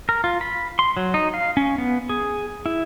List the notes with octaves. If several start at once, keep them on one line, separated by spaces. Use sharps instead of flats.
A#4
F4
B5
C6
F#3
D#4
F5
C#4
B3
G#4
E4